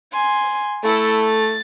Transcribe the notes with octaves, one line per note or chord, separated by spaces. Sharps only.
G#5 C6
A3 E4 A4
A6